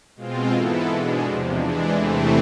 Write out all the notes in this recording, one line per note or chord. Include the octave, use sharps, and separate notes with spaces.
B2 G#3 C4 F4
G#2 E3 B3 E4 A4
B2 G#3 D4
E2 C3 F3
E3 G#3 D4
E2 C3 E3 A3 C4